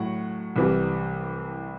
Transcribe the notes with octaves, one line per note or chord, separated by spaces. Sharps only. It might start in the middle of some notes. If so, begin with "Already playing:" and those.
Already playing: A2 F#3 F#5
C2 C3 E3 G3